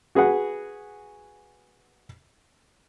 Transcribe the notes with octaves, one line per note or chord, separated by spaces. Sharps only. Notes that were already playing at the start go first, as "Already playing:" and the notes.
F#4 G#4 B4 F#5